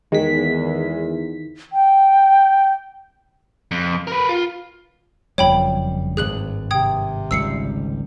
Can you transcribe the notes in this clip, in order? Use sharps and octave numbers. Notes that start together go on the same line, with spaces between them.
E2 D#3 G#3 B6
G5
F2
A#4 B4
F4
F#1 F2 G3 C#5 G5 B5
G#1 G2 G#4 F#6 F#7
C3 G5 D#6 G#6
G#1 C#2 G3 E6 C7 C#7